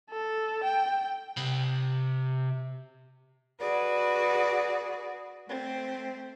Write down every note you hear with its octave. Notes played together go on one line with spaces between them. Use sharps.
A4
G5
C3 B5
F#4 G#4 B4 D5
A3 C4